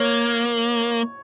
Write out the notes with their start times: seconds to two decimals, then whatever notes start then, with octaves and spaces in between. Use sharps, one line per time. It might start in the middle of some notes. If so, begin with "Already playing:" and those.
Already playing: A#3 C#5